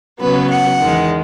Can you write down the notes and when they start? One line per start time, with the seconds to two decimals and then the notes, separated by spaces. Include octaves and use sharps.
0.19 C#3 F#3 B3 B4
0.49 F#5
0.79 E2 D#3 G#3